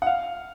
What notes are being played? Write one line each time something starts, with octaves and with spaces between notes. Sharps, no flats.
F#5
F5